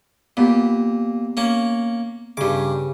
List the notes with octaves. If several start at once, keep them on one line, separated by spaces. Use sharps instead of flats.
A#2 B3 G4
A#3 C#4
G2 C#3 G4 D6